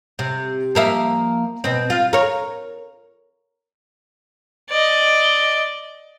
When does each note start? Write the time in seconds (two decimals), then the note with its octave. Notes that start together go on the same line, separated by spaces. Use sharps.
0.19 C3
0.75 F3 A#3 E5
1.64 B2 C4
1.90 F4
2.13 A#4 C#5
4.70 D5 D#5